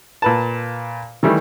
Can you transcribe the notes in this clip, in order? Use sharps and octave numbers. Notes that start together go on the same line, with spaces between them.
A#2 B4 A5
D#3 E3 G3 A3